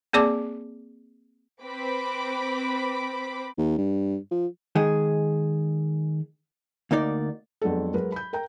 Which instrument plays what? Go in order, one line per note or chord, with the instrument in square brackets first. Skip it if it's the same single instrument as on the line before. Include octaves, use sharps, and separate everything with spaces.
[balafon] A#3 C4 G#4 D5 A5 D6
[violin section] C4 B4 B5 D6
[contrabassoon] D#2
G2
F3
[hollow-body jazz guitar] D#3 G#3 G#4
D2 A#3 D#4 D5
[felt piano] F2 F#3 G#3 B3 D4 A4
F#3 G#3 A#4 B4
B5 G6
A#4 G5 A#5 G6